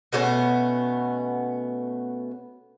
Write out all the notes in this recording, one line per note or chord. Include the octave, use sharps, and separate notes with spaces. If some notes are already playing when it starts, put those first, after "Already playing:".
B2 A3 B3 C#4